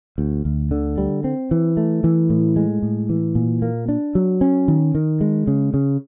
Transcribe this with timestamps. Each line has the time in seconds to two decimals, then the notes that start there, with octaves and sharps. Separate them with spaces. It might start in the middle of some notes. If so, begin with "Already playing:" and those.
0.18 D2
0.45 D2
0.71 D3
0.98 G3
1.24 C4
1.51 E3
1.77 A3
2.04 E3
2.30 A2
2.56 G#3
2.82 A2
3.09 E3
3.35 A#2
3.62 A#3
3.89 D4
4.15 F#3
4.41 C#4
4.68 D#3
4.95 D#3
5.21 G#3
5.47 C#3
5.74 C#3